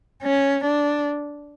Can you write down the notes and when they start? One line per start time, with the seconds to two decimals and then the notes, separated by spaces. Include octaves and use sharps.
0.23 C#4
0.65 D4